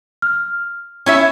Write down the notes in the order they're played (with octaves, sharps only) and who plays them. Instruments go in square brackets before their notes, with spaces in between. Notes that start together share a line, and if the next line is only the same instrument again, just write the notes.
[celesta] F6
[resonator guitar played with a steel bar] C#4 E4 E5